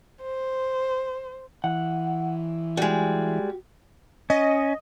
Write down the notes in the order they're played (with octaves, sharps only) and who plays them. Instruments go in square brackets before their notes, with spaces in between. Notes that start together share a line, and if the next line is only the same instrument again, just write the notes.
[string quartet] C5
[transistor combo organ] E3 [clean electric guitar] F#5
[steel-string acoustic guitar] G3 G#3 [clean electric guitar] F#4 G4
[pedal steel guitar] C#4 [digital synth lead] D#5